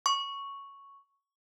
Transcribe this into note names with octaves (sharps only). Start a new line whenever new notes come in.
C#6